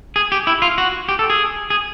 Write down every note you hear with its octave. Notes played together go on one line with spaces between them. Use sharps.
G#4
G4
E4
F4
F#4
G4
A4
G#4
G#4